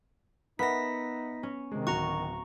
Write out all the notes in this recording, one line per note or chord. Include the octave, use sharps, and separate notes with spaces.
B3 D#4 A#4 E5 F#5 A#6 B6
C#4
C3 D#3 G#3
D1 F#4 A#5 C#6